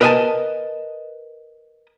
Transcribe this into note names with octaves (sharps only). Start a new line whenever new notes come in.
A#4 B4 D#5 F5 G#5 A5